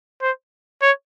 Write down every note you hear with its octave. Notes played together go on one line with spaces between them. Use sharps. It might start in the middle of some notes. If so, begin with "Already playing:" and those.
C5
C#5